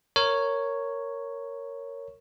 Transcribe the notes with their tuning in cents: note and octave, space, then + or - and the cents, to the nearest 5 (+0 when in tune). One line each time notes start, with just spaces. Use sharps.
A#4 -10 C#5 +0